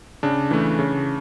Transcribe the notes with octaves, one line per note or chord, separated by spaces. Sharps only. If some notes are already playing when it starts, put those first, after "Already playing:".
C#3 D4
E3 A3
C#3